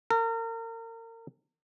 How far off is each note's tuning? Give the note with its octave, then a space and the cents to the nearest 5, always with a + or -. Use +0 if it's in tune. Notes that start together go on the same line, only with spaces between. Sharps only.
A#4 -35